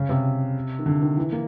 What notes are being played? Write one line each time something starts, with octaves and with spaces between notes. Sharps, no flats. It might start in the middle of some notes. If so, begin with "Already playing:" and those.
Already playing: C#3
C3
D#3
D3
D#3
E3
A#3